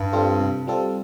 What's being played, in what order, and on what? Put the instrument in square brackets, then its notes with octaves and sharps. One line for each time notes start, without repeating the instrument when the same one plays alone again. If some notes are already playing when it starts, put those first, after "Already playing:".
Already playing: [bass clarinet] G2
[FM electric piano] G3 C4 F4 A4
C3
G3 C4 F4 A4